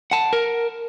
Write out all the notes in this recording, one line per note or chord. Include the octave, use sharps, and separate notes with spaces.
F#5 A5
A#4